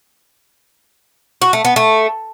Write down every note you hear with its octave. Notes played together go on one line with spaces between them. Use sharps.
F#4
A3
B3
A3